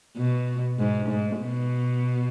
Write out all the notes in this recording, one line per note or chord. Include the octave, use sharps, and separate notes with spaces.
B2
G#2
G#2
B2